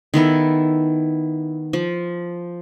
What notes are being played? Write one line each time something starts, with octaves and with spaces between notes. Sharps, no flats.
D#3 B3 E4 A4
F3